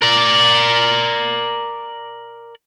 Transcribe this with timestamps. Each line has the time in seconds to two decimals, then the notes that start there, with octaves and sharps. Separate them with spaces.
0.02 A#4 D5